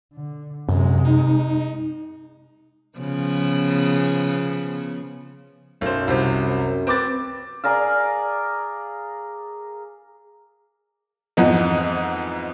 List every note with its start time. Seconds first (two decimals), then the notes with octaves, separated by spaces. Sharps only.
0.14 D3
0.69 F#2 C3 G#3
1.05 D#4
2.98 C#3 F3 B3
5.81 B1 F#2 C5
6.08 C2 C3
6.87 C4 B4 D6 A6
7.64 G#4 A#4 D5 F5
11.37 F2 G#2 E3 F3 B3 D#4